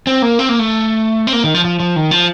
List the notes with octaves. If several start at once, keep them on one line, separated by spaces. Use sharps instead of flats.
C4
A#3
C4
A#3
A3
C4
A#3
D#3
F3
F3
F3
D#3
F3